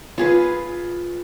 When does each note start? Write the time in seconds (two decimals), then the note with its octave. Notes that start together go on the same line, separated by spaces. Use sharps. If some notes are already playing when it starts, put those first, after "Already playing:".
0.18 F4 G#4 B4